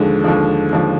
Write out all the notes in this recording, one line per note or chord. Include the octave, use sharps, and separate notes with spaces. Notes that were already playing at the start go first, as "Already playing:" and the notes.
Already playing: D#2 D3 F3 G#3
D#2 D3 F3
D#2 D3 F3